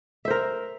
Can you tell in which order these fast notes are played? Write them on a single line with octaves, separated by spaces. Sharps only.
E5 C5 A#4